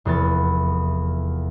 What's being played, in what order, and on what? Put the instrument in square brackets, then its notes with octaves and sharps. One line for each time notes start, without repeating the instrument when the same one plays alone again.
[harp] F1 E2 B3 A6